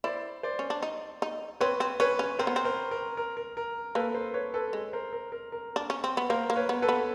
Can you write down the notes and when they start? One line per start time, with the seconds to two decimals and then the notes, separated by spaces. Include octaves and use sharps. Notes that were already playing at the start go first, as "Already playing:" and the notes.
0.04 E4 C5 D5
0.43 C5 D5
0.59 C#4
0.70 D4
0.82 D#4
1.22 D#4
1.61 C4 B4 C#5
1.80 C4
2.00 C#4 B4 C#5
2.19 C#4
2.39 C4 A#4 C5
2.47 B3
2.56 C4
2.65 A#4 C5
2.91 A#4
3.17 A#4
3.37 A#4
3.57 A#4
3.95 A#3 A4 B4
4.15 A#4 C5
4.34 B4 C#5
4.54 A4 B4
4.73 G#3
4.93 A#4 C5
5.13 A#4
5.32 A#4
5.52 A#4
5.76 D4
5.90 C#4
6.04 C4
6.17 B3
6.29 A#3 A#4 C5
6.50 A#3
6.56 B4 C#5
6.69 B3
6.82 A4 B4
6.89 B3